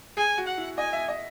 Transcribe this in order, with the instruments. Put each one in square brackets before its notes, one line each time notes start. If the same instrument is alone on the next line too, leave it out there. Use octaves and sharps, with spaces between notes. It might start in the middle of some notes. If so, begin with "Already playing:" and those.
[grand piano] G#4 [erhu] G#5
[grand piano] F#4
[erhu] F#5
[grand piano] E4
[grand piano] D#5 [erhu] G#5
[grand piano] E5
D#5